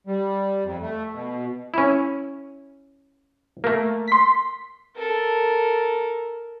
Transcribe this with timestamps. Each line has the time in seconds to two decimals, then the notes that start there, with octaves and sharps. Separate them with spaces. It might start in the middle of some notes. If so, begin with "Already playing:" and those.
0.07 G3
0.64 F2
0.81 A3
1.13 B2
1.74 C#4 E4
3.64 A3 A#3
4.08 C6 B6
4.96 A4 A#4